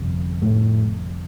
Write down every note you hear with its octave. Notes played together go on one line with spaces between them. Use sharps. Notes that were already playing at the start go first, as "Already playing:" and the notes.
Already playing: G1 F2 C3
A2 A3